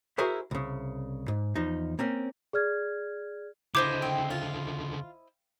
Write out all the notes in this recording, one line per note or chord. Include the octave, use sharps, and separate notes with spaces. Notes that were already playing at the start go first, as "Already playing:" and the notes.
E4 F#4 G#4 A#4 C5 E5
C2 C#3
G#2
E2 F3 D#4
A#3 C4 C#4
G#4 D5 F6 G#6
C#2 D3 E4 C5 D#5 D6
C4
F4